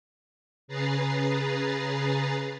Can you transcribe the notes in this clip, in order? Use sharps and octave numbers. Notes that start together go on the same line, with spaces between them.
C#3 G#4 B4 A#5 A6 C7